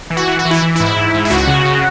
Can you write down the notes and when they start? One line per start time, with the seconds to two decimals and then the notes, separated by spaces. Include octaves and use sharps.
0.10 E3
0.17 F#4
0.28 E3
0.39 F#4
0.45 E3
0.51 E4
0.62 E3
0.76 G#2 E4
0.96 G#2
1.14 G#2
1.25 E4
1.30 C#2 F#4
1.47 C#3
1.65 C#3